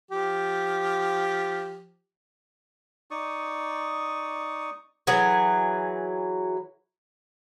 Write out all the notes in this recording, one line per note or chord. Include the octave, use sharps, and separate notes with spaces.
F3 G4
D#4 D5 C#6 D#6
E3 F#3 G#4